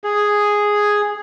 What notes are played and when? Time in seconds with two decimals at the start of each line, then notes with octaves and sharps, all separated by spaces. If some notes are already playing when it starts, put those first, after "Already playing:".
0.04 G#4